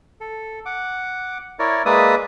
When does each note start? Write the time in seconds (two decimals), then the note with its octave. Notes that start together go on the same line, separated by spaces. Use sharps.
0.20 A4
0.66 F#5 D6
1.59 E4 A#4 C#5 D5
1.85 G#3 A#3 B4 D5 E5 D#6